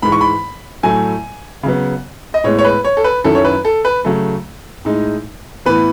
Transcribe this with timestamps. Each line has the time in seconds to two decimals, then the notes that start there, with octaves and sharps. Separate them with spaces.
0.02 G#2 E3 G#3 B5
0.12 C#6
0.21 B5
0.83 A2 F#3 A3 E4 G#5
1.63 C#3 F#3 B3
2.34 D#5
2.44 A2 G#3 B3 C#5
2.59 C#5
2.65 B4
2.84 C#5
2.97 A4
3.04 B4
3.24 F#2 D#3 F#3 C#4 E4 A4
3.35 C#5
3.45 B4
3.65 A4
3.85 B4
4.05 C#3 F#3 A3
4.85 A2 G#3 D#4
5.66 A2 E3 B3 B4